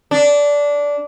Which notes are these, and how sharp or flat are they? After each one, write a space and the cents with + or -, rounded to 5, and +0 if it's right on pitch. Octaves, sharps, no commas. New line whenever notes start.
D4 -15